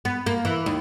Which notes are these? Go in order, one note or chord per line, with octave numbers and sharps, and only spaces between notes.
B3
A#3
E3
D#2